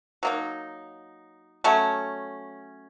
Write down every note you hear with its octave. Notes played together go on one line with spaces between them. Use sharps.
F#3 A#3 D#4
F#3 A3 C#4